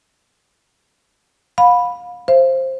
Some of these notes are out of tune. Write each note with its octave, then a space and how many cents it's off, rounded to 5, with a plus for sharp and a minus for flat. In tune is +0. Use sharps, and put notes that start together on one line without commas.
F5 +35 B5 +0
C5 +10 F5 -45